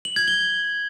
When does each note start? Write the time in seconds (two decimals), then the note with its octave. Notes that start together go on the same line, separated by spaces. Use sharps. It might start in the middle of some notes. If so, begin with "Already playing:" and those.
0.05 F#7
0.16 G#6
0.28 G7